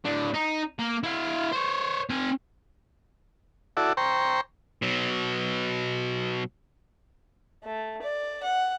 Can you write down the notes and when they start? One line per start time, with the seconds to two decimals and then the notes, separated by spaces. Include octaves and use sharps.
0.05 A2 D4
0.34 D#4
0.79 A#3
1.03 E4 F5
1.53 C5 C#5
2.10 C4 G#5
3.77 E4 F#4 A4 D5
3.97 C5 G5 A#5 C#6
4.82 B2 F#3
7.64 A3
8.02 D5
8.43 F#5